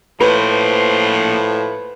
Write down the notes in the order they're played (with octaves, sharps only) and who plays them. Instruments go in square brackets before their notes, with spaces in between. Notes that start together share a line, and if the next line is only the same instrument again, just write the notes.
[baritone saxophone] A2 [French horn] F3 [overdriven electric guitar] A#3 C5 [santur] B4